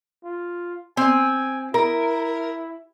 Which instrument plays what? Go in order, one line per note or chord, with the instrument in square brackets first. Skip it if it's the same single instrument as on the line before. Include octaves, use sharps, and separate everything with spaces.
[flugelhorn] F4
[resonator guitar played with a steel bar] C4 [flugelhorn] G#5
[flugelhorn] E4 [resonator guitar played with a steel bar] A#4